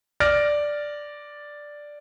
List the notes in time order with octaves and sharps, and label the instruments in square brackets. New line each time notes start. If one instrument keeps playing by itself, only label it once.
[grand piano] D5 F6 A6 A#6 D7